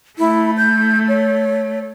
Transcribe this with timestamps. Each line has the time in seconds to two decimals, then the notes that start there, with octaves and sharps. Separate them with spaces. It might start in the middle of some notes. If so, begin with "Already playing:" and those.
0.18 A3 E4
0.58 G6
1.08 C#5